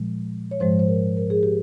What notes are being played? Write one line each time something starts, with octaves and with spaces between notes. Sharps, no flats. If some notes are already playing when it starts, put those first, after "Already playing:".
Already playing: A#2 F3 G#3
C#5
G#2 F3 G#3 C5
C5
A#4
A#4
G#4
G4